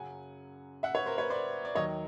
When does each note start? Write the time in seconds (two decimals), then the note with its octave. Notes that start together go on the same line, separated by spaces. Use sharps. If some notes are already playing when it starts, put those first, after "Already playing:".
Already playing: F#2 C#3 F#3 F#5 G#5
0.83 E5 F#5
0.95 B4 C#5
1.06 A#4 C5
1.18 B4 C#5
1.30 C5 D5
1.65 D5
1.75 D#2 D#3 F#3 C#5 D#5